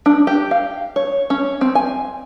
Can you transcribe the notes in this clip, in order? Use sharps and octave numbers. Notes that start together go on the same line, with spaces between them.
D4
G4
F5
C#5
C#4
C4
G#5